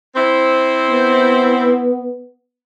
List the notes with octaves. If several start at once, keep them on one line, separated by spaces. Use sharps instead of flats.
C4 E4 C5
B3